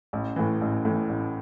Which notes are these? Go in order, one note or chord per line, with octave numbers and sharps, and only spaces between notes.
A1
A2 E3
A1
A2 E3
A1